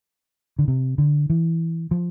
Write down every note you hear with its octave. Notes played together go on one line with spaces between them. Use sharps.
D3
C3
D3
E3
F3